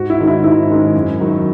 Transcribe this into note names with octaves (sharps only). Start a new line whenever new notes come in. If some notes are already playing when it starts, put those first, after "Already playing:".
Already playing: G#2 F#4
E4
D#3 G#3 C#4
E4
G#2 E4
D#3 G#3 C#4
F#2
D#3 F#3